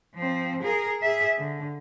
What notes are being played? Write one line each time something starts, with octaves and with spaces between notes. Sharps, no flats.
F3 C4
G#4 A#4
G#4 E5
D3